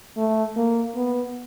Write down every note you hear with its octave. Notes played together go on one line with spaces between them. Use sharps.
A3
A#3
B3